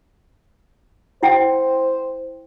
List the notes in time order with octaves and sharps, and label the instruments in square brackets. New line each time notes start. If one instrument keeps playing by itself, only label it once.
[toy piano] E4 F#5 G5 [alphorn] C5